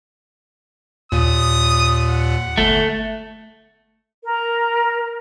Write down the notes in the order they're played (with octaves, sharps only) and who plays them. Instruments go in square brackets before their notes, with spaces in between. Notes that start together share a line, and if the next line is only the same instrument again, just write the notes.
[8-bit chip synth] D#2 A#2 [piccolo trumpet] D#6
[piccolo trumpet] F#5
[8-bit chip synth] G1 [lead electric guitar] A3
[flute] A#4